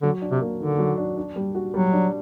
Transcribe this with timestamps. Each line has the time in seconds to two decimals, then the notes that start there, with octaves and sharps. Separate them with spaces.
0.02 D3 F#3
0.22 D4
0.31 C3
0.41 A#3
0.60 D3 D#3
0.78 F#3
0.98 D4
1.17 D4
1.36 G3
1.55 F#4
1.74 F#3 G3
1.93 D4